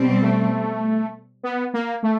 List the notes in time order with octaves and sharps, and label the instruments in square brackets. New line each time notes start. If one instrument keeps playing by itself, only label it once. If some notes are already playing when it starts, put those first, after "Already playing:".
Already playing: [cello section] B2 G3 C4
[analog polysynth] A3
B3
A#3
A3